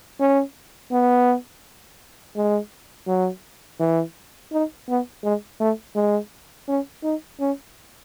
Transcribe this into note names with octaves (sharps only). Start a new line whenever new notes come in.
C#4
B3
G#3
F#3
E3
D#4
B3
G#3
A3
G#3
C#4
D#4
C#4